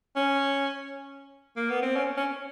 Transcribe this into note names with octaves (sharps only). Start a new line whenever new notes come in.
C#4
A#3
B3
C4
C#4
C#4